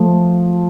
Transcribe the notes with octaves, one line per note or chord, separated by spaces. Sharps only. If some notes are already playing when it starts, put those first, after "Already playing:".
Already playing: F3 A3